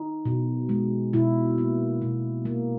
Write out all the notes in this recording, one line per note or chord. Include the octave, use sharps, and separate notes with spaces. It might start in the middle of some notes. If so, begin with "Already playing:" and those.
Already playing: D#4
B2
G#3
B2 E4
A#3
B2
A#3